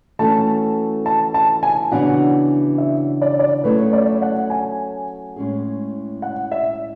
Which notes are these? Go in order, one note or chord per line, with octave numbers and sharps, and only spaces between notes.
E3 A3 C#4 F#4 A4 A5
A5
A5
G#5
C#3 E3 B3 D4 F#4 F#5
E5
D5
C#5
D5
F#3 A3 C#4 E4 G#4 B4
D5
F#5
G#5
A2 G#3 C#4 G#4
F#5
E5